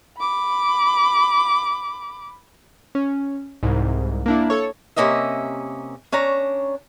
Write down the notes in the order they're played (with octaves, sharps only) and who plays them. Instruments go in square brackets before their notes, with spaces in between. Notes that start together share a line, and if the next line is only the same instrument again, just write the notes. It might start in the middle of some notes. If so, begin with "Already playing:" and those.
[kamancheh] B5 D6
[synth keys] C#4
C2 G#2
A#3 D4 E4
A4 C#5
[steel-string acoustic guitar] C3 D#3 A#3 C#4 D#5 E5
C#4 D4 C#5 A#5